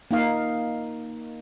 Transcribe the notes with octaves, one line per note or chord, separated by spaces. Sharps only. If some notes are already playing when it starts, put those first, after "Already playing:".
A#3 D#4 F5